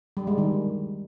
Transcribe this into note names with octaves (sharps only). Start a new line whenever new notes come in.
G3
G#3
D#3